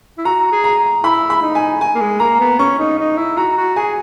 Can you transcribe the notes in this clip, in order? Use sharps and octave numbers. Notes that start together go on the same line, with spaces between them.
E4
F#4 A#5
G#4
A#5
E4 B5
B5
D#4
G#5
G#5
A#3
G#3
A#3 A#5
B3
C#4 C#6
D#4
D#4
E4
F#4 A#5
F#4
G#4 G#5